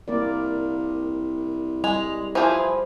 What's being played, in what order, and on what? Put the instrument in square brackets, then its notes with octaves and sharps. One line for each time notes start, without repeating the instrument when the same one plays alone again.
[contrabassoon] C2 [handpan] A#3 A#4 D5
[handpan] G3 [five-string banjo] G#3 [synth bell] F7
[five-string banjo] E3 F3 G#4 [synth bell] C5